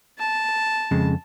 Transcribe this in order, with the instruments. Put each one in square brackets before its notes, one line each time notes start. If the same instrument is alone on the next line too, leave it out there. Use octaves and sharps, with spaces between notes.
[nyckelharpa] A5
[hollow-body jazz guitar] F2 C#3 G#3